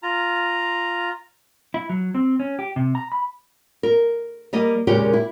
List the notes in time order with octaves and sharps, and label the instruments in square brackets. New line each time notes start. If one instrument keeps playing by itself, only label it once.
[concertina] F4 A#5
[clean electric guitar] E4
F#3
C4
C#4
G4
C3
A#5
B5
[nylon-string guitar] A#4
G3 A#3 D#5
E2 A#2 C#3 G#3 G4 A#4
E4